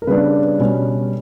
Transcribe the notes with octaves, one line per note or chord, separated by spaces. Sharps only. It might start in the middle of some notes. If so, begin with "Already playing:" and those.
A#4
C#3 G3 B3 D4 B4
B2 G3 C#4